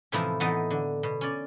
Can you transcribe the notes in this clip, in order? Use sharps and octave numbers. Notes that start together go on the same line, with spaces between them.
A2 C3 E3 F3 D#4 E4
A2 E3 B3 D#4 D#5 A5
D3
B2
C#4 D5